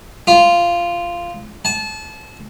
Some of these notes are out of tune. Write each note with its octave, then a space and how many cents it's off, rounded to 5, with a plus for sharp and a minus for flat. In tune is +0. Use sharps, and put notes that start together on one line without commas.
F4 -10
A5 -30